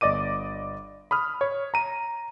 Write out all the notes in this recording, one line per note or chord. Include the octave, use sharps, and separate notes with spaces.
G1 D5 D#5 D6 D#7
B5 D#6 F6
C#5
A#5 D#7